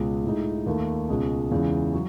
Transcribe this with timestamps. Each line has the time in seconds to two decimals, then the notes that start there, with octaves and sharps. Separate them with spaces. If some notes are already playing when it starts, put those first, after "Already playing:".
Already playing: C#2 B2 G#3
0.24 A2 G#3 D#4
0.66 D#2 D#3 A3
1.09 C#2 B2 G#3 C#4
1.51 E2 C#3 G#3
1.93 F#3